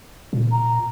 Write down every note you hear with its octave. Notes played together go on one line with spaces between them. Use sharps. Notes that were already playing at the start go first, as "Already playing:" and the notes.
A#2
A#5